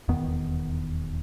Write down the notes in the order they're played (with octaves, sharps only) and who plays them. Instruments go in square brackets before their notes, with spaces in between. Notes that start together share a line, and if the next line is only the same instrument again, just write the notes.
[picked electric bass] D#1 E2 D#3 B3